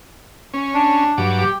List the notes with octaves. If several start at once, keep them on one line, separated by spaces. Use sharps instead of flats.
C#4
D4
G2 F#3 D6
G4